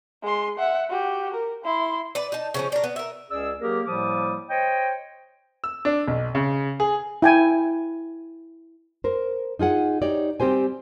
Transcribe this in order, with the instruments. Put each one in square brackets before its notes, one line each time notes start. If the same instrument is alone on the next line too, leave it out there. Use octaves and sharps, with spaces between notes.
[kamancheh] G#3 C6
E5 F#5
F#4 G4
A#4
E4 C6
[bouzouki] B4 D5
D#4 A5
C#3 F3 C#4
D4 A#4
B3
A#4 E5
[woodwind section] C#2 C#4 G#4 D5 E6
F#3 A#3 G4 G#4 A#4
A2 F3 G3 A#3 D6 D#6
C5 C#5 D#5 G5
[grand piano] E6
D4
B1
C#3
G#4
[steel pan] E4 G5 G#5
[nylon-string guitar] A#4 C5
D#4 F4 G#4 F#5
D#4 G4 C#5 D5
G3 C4 G4 C5 G#5